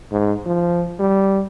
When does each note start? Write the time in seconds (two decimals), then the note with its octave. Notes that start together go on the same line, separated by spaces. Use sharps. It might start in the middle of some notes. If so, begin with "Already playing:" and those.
0.12 G#2
0.46 F3
0.99 G3